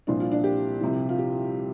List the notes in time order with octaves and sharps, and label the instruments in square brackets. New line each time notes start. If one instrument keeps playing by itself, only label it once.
[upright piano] C2 A#2 F3 D4
F4
D4
G4
C2 C3 F3
F4
G4